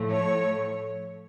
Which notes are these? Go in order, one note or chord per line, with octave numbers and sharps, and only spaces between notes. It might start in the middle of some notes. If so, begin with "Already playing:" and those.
Already playing: A2 F3 A3
C#5